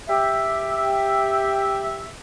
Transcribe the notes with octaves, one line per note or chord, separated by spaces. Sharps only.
G4 E5